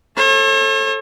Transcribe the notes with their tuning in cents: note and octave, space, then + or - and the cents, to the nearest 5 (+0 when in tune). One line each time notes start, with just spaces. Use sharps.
A4 +0 C#5 -45